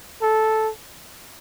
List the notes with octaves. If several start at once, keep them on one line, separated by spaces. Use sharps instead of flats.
A4